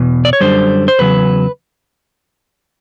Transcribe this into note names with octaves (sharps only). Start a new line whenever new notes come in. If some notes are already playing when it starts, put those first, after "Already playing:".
Already playing: E2 B2
D5
C#5
F#2 D3 G3 C5
C5
E2 C#3 F#3 B4